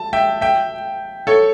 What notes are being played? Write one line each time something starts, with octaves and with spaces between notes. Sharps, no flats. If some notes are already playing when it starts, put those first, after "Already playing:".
Already playing: A5
E5 G5
E5 G5
A4 C#5